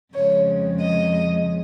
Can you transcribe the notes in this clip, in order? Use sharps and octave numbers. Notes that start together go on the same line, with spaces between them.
F2 C#3 F3 G#3 C#5
D#5